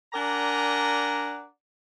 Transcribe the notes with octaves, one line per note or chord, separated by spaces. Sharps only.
D4 A#4 D5 F#5 G#5 A#5